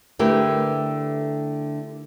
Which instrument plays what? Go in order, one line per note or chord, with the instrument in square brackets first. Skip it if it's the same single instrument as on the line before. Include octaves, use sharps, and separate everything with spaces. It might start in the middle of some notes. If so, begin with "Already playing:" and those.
[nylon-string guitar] D3 A3 E4 G4 A#4 B4